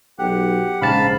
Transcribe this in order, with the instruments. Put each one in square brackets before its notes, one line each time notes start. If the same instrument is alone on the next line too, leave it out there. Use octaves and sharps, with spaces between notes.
[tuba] B1 [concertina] G4 F#5
[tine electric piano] A#1 G#2 A5 [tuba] C#3 [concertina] F5 B5